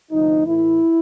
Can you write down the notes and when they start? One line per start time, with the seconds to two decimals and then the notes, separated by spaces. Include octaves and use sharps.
0.12 D2 C3 F3 D#4
0.46 A2 E3 A3 E4